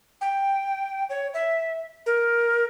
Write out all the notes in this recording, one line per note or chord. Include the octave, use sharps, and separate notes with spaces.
G5
C#5
E5
A#4